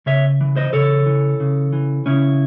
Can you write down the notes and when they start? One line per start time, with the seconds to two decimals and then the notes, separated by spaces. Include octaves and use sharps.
0.06 C#3 C#5 E5
0.41 E3
0.56 C5 D#5
0.73 C#3 A4 C#5
1.06 E3
1.40 C#3
1.73 E3
2.06 C#3 C#4 E4